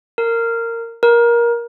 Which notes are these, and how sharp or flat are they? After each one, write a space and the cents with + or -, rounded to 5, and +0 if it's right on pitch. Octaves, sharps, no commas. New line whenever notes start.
A#4 -15
A#4 +20